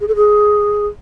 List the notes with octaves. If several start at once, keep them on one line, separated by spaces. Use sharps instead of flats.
G#4
A4
G#4